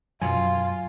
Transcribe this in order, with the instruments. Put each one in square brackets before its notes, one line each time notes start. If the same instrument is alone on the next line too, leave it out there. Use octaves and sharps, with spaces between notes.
[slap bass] F#2 B2 F#3 [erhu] F4 [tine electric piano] G#5